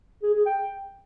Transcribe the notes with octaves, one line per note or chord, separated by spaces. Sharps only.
G#4
G#4
G5